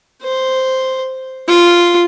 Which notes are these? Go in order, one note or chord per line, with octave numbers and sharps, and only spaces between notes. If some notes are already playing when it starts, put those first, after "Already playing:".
C5
F4